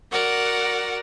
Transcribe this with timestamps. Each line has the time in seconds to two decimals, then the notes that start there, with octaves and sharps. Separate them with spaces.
0.11 F#4 A#4 D5 F#5